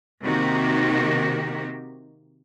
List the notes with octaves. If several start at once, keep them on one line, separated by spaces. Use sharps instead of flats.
C3 D#3 A#3 D#4 F#4 G4